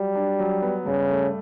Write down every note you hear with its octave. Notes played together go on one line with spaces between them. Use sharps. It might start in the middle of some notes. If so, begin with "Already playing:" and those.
Already playing: F#3 G3
D4
F#3
B3
G2 C#3
A3